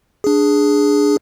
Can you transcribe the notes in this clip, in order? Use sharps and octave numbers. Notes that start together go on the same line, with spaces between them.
D4 G#4